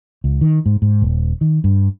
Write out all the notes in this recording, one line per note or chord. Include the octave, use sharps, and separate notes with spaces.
C#2
D#3
G#2
G#2
D#1
D#3
G2